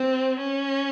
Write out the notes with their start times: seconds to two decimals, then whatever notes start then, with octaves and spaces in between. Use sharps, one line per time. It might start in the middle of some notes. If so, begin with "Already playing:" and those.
Already playing: C4
0.39 C#4